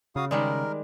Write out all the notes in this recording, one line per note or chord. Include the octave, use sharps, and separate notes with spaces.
C#3 F#4 F5 D#6
D#3 G3 G#3 A#4 D5